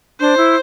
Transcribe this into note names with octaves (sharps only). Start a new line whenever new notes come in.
D4 C5
E4